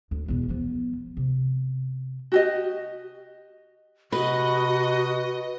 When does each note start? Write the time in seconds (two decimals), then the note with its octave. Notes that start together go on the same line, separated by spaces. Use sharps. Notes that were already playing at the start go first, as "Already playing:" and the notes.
0.11 D2
0.28 E2 B2
0.49 F3 B3
1.17 C3
2.32 F#4 G4 D#5
4.12 C3 F#4 B4 D#5